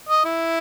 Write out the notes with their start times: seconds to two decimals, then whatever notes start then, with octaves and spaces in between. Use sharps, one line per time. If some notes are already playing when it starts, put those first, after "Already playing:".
0.09 D#5
0.25 E4